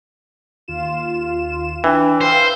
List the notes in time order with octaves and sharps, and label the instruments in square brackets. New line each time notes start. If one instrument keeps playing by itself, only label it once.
[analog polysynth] D#2 F4 E7
[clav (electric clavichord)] E3 [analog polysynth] D4 [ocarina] G5
[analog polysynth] B4 F5 E6 [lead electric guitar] C5